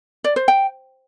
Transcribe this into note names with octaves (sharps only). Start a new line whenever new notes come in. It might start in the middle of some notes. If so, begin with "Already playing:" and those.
D5
C5
G5